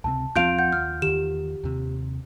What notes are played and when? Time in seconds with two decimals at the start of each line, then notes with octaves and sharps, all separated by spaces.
0.04 C#2 C3 C4 A5
0.36 E2 F3 C4 F4 F5 G6 D7 F7
0.59 F#5 G6
0.73 D#2 F6
1.02 E2 D#3 G4 E7
1.64 D#2 C3